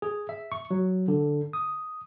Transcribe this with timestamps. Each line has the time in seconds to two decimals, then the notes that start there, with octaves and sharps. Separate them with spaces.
0.02 G#4
0.29 E5
0.52 C#6
0.71 F#3
1.08 D3
1.53 D#6